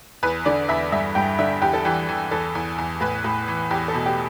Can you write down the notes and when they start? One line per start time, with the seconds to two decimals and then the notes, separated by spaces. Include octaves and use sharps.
0.23 E2 B4
0.45 D3 D5
0.69 E2 E5
0.92 G2 E5
1.15 G2 G5
1.39 D3 E5
1.62 E2 G4
1.73 A4
1.85 E3 G4
2.09 E3
2.31 E2 A4
2.55 E2
2.78 E2
3.01 A2 B4
3.24 A2
3.48 E3
3.71 E2 G4
3.88 A4
3.94 B2
4.06 G4